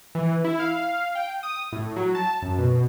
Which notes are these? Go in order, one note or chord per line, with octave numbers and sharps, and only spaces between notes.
E3
E4
F5
G5
D#6
A2
F#3
A5
F#2
B2